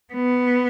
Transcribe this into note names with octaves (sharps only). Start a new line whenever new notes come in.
B3